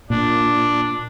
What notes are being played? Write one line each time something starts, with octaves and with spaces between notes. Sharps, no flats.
A#2 D4